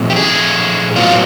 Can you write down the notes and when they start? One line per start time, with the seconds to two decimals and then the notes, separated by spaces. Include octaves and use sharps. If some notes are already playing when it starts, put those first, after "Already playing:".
Already playing: A#2 F3 A3 C4
0.10 G4
0.16 G#4
0.95 A2 F#3 B3 F4